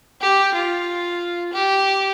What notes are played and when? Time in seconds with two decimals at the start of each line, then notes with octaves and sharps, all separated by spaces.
0.21 G4
0.54 F4
1.53 G4